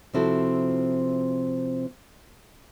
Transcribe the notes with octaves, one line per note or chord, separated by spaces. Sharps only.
C3 F3 C4 E4 F#4 A4